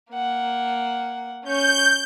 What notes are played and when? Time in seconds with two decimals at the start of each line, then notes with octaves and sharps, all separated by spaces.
0.12 A#3 F#5
1.45 C#4 C#6 G6